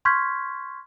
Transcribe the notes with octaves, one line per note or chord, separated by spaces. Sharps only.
C6 C#6 F6 G6 G#6 B6